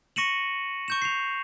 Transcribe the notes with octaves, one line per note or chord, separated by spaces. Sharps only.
C#6 A#6 C#7 D#7 E7 F#7
C#6 G6 E7
C7 F7